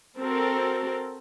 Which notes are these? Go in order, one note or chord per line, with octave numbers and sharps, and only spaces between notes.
C4 F#4 A4 A#4